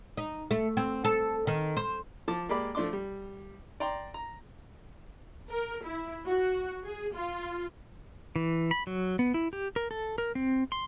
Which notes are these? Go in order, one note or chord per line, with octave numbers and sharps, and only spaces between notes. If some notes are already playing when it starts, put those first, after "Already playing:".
D#4
A3
C4
A4
D#3
C5
F3 A5 D6
G#3 A#3 G4 D5 B5 D6
F3 A3 D4 C6 D6
G3
D5 G5 A#5 C6
A#5
A#4
E4
F#4
G#4
F4
E3
B5
F#3
B3
E4
G4
A#4
A4
A#4
C4
C6